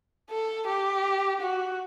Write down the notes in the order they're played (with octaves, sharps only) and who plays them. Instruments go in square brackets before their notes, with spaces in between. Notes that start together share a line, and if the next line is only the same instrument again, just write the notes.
[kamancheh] A4
G4
F#4